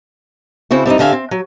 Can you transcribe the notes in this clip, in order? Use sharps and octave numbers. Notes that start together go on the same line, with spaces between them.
C#3 C4 E4 F#4
G3 C4 D4 D#4
D3 C4 G4 E5 F5 G#5
C4
F#3